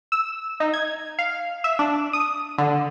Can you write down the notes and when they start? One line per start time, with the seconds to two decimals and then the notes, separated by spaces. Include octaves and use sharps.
0.12 E6
0.60 D#4
0.74 G#6
1.19 F5
1.64 E5
1.79 D4
2.13 D#6
2.58 D3